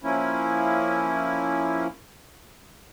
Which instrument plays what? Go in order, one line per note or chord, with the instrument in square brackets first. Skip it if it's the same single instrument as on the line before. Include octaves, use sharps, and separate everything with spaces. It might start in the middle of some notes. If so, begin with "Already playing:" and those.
[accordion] F3 A#3 C#4 E4